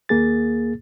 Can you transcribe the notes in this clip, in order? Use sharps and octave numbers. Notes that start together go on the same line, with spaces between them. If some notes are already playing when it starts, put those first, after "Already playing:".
D#2 A#3 G#4 A6